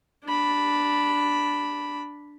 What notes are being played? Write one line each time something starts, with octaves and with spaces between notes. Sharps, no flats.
D4 B5